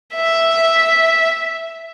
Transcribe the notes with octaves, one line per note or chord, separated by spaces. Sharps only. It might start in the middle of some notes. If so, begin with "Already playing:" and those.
E5